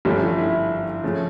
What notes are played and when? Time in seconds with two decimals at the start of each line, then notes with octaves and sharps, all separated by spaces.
0.05 G1 G2 F3 A3 C#4 G4
0.22 F4
0.38 E4
1.03 C#3 F3 A3